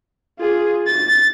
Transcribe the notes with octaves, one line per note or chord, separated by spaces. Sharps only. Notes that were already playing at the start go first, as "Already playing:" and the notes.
F4 G#4
A6